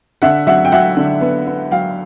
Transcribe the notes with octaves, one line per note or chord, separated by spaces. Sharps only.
D3 E5 F#5
F#3 E5 F#5
G5
F#3 E5 F#5
D3
B3
B3
F#3 F5 G5